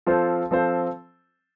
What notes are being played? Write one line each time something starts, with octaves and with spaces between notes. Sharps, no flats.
F3 C4 F4 A4 C5
F3 C4 F4 A4 C5